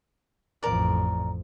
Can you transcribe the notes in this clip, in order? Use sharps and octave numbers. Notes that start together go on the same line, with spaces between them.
A1 F2 A#4 D5